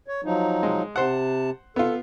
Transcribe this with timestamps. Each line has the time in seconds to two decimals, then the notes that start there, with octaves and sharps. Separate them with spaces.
0.08 C#5
0.25 F3 F#3 D#4
0.63 G#3
0.96 C3 C5 F#5 A5
1.76 B3 F4 A4